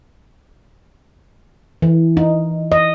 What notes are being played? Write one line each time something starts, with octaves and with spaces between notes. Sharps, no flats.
E3
D#4
D#5